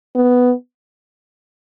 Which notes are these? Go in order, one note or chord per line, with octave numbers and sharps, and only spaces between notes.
B3